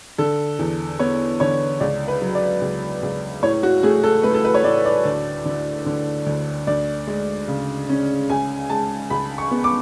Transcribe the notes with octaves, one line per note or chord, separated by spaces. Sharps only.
D3 A4
E2
B3 C#5
D3 C#5
C#2 D5
B4
F#3
D5
C#2
C#2
A2 C#5
F#4
A3 G#4
A4
A3 B4
A4
B4
C#5
A2 D5
D5
D2
D3
D3
D2
D2 D5
G#3
C#3
C#4
C#2 G#5
G#3 A5
C#2 B5
C#6
B3
D6